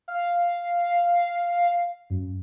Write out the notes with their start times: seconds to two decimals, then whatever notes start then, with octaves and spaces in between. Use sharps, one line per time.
0.08 F5
2.10 F#2